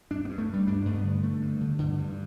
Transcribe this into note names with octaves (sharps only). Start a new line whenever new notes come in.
G2 D4
B3
G2
A3
G2
G3
G2 D4
G2 A3
B3
D3
D3 A3
G2
D3
G2 D3
G2